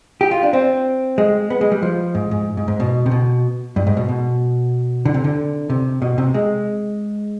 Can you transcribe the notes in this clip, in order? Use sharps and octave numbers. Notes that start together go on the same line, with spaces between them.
G4
F4
D4
C4
G#3
B3
G#3
G3
F3
G#2
G#2
G#2
G#2
B2
C3
B2
G2
G#2
B2
B2
D3
C3
D3
C3
B2
C3
G#3